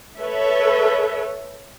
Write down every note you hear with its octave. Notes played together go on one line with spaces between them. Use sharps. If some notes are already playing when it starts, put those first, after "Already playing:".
A4 B4 C#5 E5